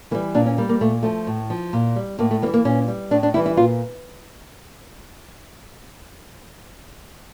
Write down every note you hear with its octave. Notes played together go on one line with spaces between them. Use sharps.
E3 G3 A#3
A#2 D4
C#4
G3 A#3
A#3
A#2 A3
F3 A3
A2
F3
A#2
G3
A2 A#3
A3
E3 G3 A#3
A#3
A#2 C#4
G3
A2 D4
D4
E3 G3 E4
E4
A#2 F4